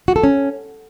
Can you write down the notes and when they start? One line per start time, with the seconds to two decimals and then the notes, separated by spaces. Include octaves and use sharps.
0.08 F#4
0.16 A4
0.24 C#4